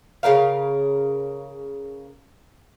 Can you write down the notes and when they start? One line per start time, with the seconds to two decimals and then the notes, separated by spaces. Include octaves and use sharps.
0.23 C#3 F3 A#4 F5